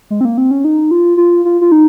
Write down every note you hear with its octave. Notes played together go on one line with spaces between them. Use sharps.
G#3
C4
A#3
C4
C#4
D#4
F4
F4
F4
F4
D#4